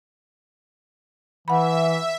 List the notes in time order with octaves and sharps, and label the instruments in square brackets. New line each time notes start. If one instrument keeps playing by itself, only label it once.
[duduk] E3 [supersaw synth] E5 [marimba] F#5 B5